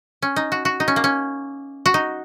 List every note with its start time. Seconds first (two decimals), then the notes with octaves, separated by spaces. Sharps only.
0.22 C#4
0.36 D#4
0.52 F#4
0.65 F#4
0.80 D#4
0.88 C#4
0.96 A#3
1.04 C#4
1.86 F#4
1.94 D#4